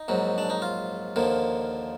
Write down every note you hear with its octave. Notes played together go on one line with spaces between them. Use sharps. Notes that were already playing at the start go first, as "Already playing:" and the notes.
Already playing: D#4
A#1 G#2 F#3
D4
D#4
F4
D#2 D3 F3 A#3